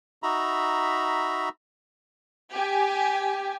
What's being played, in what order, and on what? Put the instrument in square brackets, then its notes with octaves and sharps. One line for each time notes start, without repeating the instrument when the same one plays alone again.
[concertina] D#4 F#4 E5 A#5 B5
[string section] G4 G#5